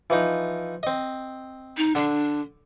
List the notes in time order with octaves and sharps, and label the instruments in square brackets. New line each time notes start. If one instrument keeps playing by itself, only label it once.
[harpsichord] E3 F3 D#4
C4 D#5
[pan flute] D#4
[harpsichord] D3 [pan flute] D4